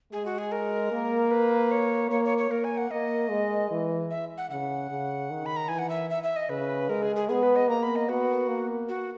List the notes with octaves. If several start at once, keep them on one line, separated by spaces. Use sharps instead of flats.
G#3 G#4
F#4
G#4
A#4
A#3
B4
C#5
A#3 C#5
C#5
C#5
A#3 A#4
G#5
F#5
A#3 D#5
G#3
E3
E5
F#5
C#3 F#5
C#3
D#3
B5
A#5
E3 G#5
F#5
E5
E5
E5
D#5
C#3 B4
G#3 A#4
G#4
G#4
B3 G#4
B4
D#5
A#3 A#5
B5
D#5
B3 F#4
A#3
F#4